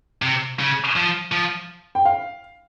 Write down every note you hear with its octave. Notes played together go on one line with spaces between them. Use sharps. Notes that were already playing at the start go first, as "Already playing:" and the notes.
C3
C#3
F3
F3
G5
F5